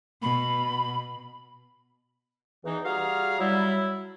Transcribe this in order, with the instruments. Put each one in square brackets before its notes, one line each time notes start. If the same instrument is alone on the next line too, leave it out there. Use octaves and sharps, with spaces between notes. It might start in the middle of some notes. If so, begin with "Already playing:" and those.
[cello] B2 [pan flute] B5
[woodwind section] E2 E3 D#4
G3 F#4 G#4 F5 A#5 F6
F#3 G3 E4